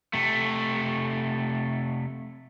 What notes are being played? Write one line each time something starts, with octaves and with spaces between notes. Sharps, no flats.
C3 A3